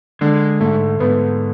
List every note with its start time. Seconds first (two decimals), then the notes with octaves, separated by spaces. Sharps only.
0.21 D3 G#3
0.60 G#2 A3
1.00 G#2 B3